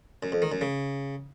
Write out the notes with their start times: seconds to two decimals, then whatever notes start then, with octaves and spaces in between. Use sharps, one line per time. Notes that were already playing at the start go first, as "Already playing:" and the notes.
0.23 F#2
0.32 F2
0.42 D#3
0.52 F#2
0.61 C#3